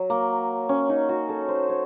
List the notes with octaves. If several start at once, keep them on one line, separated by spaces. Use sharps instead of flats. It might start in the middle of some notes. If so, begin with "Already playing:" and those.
Already playing: F#3
A#3
C#4
D#4
F#4
A4
C5
C#5